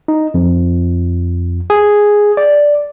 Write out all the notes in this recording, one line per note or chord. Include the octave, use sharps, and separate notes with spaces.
D#4
F2
G#4
D5